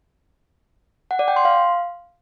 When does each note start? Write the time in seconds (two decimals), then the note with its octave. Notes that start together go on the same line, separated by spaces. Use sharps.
1.11 F#5
1.19 D5
1.28 G5
1.36 C6
1.45 F5